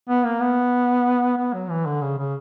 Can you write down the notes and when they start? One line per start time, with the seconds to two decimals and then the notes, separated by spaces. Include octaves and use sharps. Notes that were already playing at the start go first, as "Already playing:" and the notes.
0.09 B3
0.25 A#3
0.41 B3
1.38 B3
1.54 F#3
1.70 E3
1.86 D3
2.02 C#3
2.18 C#3